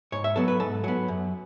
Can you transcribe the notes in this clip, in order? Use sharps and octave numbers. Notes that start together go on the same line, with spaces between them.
G#2 C#5
E5
F#3 B3 A4
B4
G#2 A4
F#3 B3
F#2